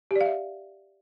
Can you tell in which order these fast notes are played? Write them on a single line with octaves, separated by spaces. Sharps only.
G4 D5 F5 E5